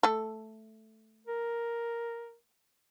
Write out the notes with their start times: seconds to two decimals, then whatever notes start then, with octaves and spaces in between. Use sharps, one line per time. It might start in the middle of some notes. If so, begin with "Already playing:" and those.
0.03 A3 A4
1.27 A#4